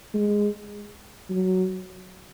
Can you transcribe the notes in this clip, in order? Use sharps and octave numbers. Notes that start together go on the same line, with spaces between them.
G#3
F#3